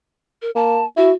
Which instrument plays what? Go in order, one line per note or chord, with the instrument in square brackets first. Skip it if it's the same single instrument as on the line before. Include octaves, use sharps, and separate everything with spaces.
[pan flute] A#4
[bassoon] A#3 [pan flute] A5
[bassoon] E4 [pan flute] F#4